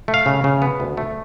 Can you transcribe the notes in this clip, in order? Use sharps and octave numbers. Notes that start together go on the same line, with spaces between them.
A3
F5
C#3
C#3
B3
D2
A3